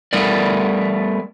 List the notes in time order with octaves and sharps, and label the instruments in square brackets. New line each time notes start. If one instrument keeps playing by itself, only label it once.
[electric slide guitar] G3 A3 B3 A#4 D5